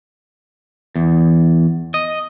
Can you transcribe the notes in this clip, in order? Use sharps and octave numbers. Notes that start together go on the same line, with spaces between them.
E2
D#5